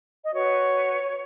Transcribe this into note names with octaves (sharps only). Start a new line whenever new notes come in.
D#5
F#4 B4 C#5